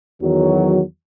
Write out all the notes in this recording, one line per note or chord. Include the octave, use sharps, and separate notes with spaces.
E2 D#3 F#3